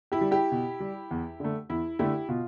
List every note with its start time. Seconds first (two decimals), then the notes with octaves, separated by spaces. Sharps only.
0.12 E4 G4
0.21 G3
0.31 E4 G4
0.52 B2
0.80 G3
1.11 E2
1.40 D3 A3
1.69 E2 E4
1.99 D3 A3 E4 G4
2.29 B2 F4